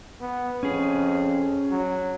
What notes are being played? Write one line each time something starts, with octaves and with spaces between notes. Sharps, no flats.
B3
F2 C#4 G#4
F#3